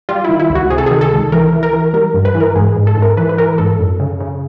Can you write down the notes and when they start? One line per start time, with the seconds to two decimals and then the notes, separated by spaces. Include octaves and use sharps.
0.09 G3 F4
0.25 D#3 E4
0.40 E4
0.50 C#2
0.55 F#4
0.70 C3 G#4
0.78 A4
0.86 D#3 G#4
1.01 A4
1.12 C#2
1.32 E3 A#4
1.53 E3
1.63 A#4
1.73 E3
1.94 G3 A#4
2.14 G2
2.25 B4
2.35 E3
2.40 A#4
2.55 G#2 G#4
2.76 G#2
2.87 A4
2.97 G#2
3.02 A#4
3.17 E3 B4
3.29 B4
3.38 E3 A#4
3.58 G#2 A4
3.79 F#2
4.00 C#3
4.20 C#3